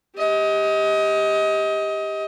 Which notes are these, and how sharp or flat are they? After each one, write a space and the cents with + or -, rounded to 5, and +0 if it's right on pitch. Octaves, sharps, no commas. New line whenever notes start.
G4 +15 D#5 +25